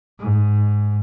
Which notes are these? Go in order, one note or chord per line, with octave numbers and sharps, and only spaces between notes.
G#2